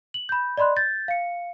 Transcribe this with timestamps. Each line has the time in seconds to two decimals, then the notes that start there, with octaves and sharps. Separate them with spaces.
0.14 F#7
0.29 B5 G6
0.57 D5 D#5 B5 C6 F#6
0.76 G6 A6
1.08 F5 C#7